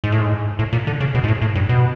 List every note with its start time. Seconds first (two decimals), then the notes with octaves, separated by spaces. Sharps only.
0.04 G#2
0.12 A2
0.20 G#2
0.59 A2
0.73 A#2
0.87 D3
1.01 C#3
1.14 B2
1.24 G#2
1.28 A2
1.42 A2
1.55 G2
1.69 B2